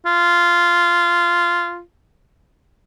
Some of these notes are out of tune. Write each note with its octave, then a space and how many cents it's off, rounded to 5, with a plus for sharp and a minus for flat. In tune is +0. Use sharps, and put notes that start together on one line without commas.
F4 -10